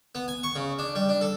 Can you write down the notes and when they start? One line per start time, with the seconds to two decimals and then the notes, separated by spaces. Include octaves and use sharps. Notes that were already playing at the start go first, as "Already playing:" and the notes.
0.15 B3
0.28 G#5
0.43 C#6
0.56 C#3
0.79 D4
0.95 G3
1.09 D4
1.21 A4